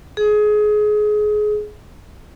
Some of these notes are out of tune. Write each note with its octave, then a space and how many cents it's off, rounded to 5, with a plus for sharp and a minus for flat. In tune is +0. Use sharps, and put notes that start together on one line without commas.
G#4 +25